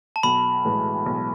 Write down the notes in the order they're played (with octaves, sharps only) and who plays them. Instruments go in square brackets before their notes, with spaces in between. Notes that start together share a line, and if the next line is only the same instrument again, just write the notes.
[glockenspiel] A5
[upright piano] B1 [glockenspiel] B5
[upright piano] A2 E3 G#3
B1